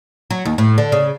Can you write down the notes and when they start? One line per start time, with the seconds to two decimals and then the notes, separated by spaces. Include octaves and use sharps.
0.30 F#3
0.45 D#2
0.58 A2
0.78 D3
0.92 C#3